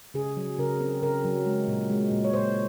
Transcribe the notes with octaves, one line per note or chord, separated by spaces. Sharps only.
C#3 G#4
F#3
C#3 A#4
C4
C#3 A#4
F#3
G#3
A#2
G#3
A#2
C#5
A#2 C5